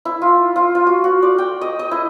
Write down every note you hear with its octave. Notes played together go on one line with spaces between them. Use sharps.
E4
F4
F4
F4
F#4
F#4
D5
G5
D#5
D#5
E4